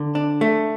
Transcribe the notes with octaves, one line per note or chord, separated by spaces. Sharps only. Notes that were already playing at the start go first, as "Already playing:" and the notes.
Already playing: D3
D4
A3